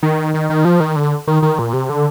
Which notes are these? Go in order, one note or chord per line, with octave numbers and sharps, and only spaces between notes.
D#3
D#3
D#3
F3
D#3
D3
D#3
D#3
A#2
C3
D3